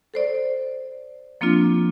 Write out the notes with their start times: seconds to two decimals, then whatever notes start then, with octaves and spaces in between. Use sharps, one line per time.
0.14 A4 C5 D5
1.41 F3 A#3 C4 D4 F4